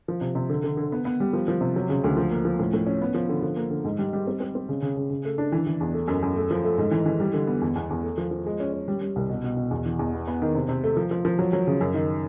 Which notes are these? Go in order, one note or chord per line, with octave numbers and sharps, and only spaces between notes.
F3
C3
C3
D3
D3
D3
B3
B3
G3
F3
F3
C3
F#3
C#3
D2
F3
A#3
F3
A2
A2
C#4
B3
F3
D3
F3
A#3
D3
G#2
G3
G3
C4
C4
C4
C#3
C#3
C#3
C#3
A3
D4
E3
E3
E2
A3
F#2
F#2
A3
F3
A3
G#2
E3
E3
G3
D3
B3
E2
E2
E2
A3
F3
F3
G#3
C#4
C#4
G3
G3
C2
B2
B2
B2
E2
E3
E2
B3
B3
D#3
C3
C3
A3
F3
F3
F3
F#3
F#3
C#3
F#2
D#3